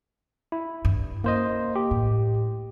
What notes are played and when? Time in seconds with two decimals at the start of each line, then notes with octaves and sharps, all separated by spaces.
0.52 E4
0.85 G2
1.24 C#3 A#3 C5 D#5
1.76 G4
1.91 A2